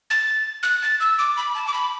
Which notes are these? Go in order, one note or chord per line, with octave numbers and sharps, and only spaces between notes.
A6
F#6
A6
E6
D6
B5
A5
D6
B5